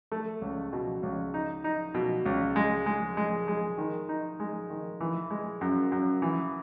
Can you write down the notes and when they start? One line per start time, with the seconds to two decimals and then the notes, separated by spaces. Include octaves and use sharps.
0.12 A3
0.42 C#2
0.73 B2
1.03 C#2
1.34 D#4
1.64 D#4
1.94 B2
2.26 C#2
2.56 G#3
2.86 G#3
3.17 G#3
3.48 G#3
3.78 D#3
4.09 D#4
4.40 G#3
4.70 D#3
5.01 E3
5.31 G#3
5.61 F#2
5.92 F#2
6.22 E3